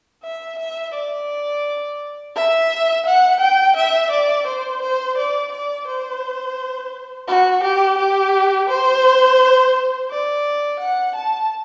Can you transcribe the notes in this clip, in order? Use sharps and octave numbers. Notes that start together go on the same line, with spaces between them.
E5
E5
D5
E5
F#5
G5
E5
D5
C5
C5
D5
D5
C5
F#4
G4
G4
C5
D5
F#5
A5